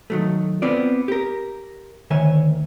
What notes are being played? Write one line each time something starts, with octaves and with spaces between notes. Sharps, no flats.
D#3 F#3 A3
B3 C4 F4 D5
G4 A#4
D2 D#3 C#5 E5 G#5